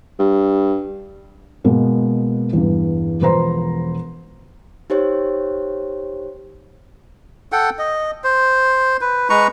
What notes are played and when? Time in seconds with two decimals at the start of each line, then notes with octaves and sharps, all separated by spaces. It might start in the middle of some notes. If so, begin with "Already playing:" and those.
0.19 G2
1.64 B2 G#3 A#3 B3
2.53 E2 G2
3.20 E1 F3 B4 C5 A#5 C6
4.90 D#4 G4 C5 C#5
7.52 A4 F#5 G5
7.78 D#5
8.24 C5
9.01 B4
9.30 G#3 B4 A#5 C#6